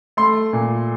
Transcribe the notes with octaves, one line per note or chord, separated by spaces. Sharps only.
A3 C6
A#2